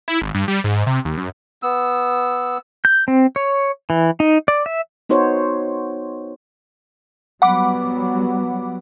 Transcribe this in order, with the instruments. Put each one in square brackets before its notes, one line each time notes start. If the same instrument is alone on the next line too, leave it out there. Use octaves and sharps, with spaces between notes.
[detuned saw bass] E4
G#1
G2
G3
G#2
C3
D#2
F#2
[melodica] B3 E6
[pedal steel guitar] G6
C4
C#5
E3
D#4
D5
E5
[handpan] B3 D#4 F#4 C5 C#5
[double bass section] F#3 G3 B3 [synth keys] F#5 B5 D6